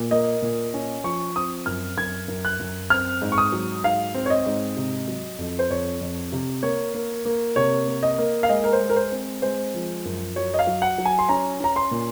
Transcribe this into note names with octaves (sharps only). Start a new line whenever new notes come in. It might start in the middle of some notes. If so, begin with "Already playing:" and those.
Already playing: A#2
A#3 D#5
A#2
C#4
F3 C#6
C4 D#6
F#2 F6
F#2 G#6
F#2
F#6
F#2
C4 F6
G#2
C#6
D#6
F#3
G#2 F5
C4
C#5
D#5
G#2
C3
F#3
F2
C5
F2 C#5
F2
C3
A#3 C#5
A#3
A#3
C3 C#5
A#3
D#5
A#3
F5
G#3 D#5
A#4
C5
G#3
A#4
C5
C4
G#3 C5
F3
F#2
F#3 C#5
D#5
F5
F#3
F#5
F#3
G#5
C6
C#4 A#5
C#4 A#5
C6
A#2